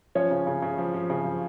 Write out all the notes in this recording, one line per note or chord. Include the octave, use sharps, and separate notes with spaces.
F3 C#4 C#5
C#3
C#3
C#3
F3
F3
C#3
F3